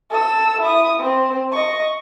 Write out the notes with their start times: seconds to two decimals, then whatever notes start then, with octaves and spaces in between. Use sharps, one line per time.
0.11 A4 E6
0.62 E4 D#6
1.00 C4
1.52 D#5 C#6